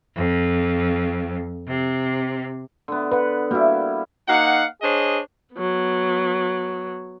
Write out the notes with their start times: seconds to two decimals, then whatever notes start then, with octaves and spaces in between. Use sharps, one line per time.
0.16 F2
1.67 C3
2.88 D3 B3
3.12 B4 F#5
3.51 G3 A#3 E4 F#4
4.28 A#3 D#4 F5 F#5
4.82 D4 G#4 C5 C#5 D#5
5.55 F#3 B3